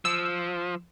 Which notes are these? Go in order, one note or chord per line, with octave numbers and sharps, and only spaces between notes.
F3 E6